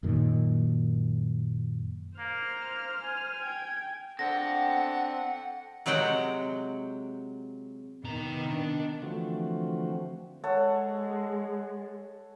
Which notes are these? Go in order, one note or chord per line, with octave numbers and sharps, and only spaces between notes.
F#2 A#2 D#3
A#3 C5 F6
G#5
G5 G#6
C4 D4 A4 F#5 G5 A#6
C3 F#3 G#3 F#5 G5
C3 D#3 B3 A#5
D4
D3 E3 F3 A3 C4 F#4
G#3 A4 C#5 F#5